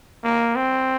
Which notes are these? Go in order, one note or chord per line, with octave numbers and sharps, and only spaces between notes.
A#3
C4